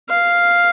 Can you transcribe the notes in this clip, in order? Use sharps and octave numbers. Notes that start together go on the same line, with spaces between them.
F5